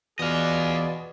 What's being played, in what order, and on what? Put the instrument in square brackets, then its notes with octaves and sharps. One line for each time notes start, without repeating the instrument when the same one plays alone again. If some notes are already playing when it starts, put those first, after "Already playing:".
[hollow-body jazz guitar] E2 [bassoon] B2 [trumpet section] F4 G#4 D5 [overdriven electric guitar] D#5 F5